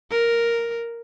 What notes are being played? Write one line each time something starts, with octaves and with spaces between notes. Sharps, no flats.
A#4